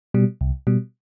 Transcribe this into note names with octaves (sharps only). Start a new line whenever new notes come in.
B2 G3
C2
B2 G3